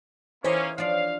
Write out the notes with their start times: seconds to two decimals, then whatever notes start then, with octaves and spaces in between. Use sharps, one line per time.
0.44 E3 A#3 C#4 G4 C5 C#5 D#5
0.78 F3 D4 D5 F5